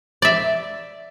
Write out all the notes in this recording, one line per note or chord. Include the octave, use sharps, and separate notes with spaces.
D5 E5